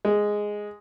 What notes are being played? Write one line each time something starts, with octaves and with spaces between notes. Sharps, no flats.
G#3